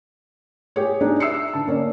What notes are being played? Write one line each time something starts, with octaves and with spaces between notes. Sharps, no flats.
G4 G#4 C#5
D4 D#4 G#4
E5 E6 C7 C#7
D3 A5
A#3 C#4 D5